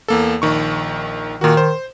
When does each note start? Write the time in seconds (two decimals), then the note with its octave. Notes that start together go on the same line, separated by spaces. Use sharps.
0.08 E2 A#3 A4
0.42 A#1 D#3 C#6
1.41 A#2 D#3 F#4
1.57 C5